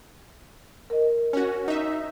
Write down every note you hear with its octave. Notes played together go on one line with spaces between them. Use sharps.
A#4 D#5
C#4 F#4
D#4 E5